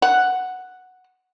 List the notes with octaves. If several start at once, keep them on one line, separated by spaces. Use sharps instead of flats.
F#5